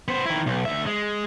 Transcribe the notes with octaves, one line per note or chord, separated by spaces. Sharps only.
B3 C5
D#3 E4
B1
D2 E5
G#3